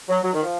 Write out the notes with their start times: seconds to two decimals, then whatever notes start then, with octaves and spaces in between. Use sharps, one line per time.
0.09 F#3
0.23 F#3
0.33 D#3
0.43 F3